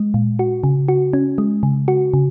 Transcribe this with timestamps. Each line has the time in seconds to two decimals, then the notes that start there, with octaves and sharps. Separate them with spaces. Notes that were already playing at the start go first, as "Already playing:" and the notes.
Already playing: G#3
0.14 A#2
0.39 F#4
0.64 C#3
0.88 F#4
1.13 C#4
1.38 G#3
1.63 C#3
1.88 F#4
2.14 C#3